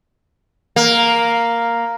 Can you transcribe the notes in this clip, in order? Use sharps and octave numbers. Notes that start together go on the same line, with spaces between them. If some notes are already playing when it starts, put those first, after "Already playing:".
A#3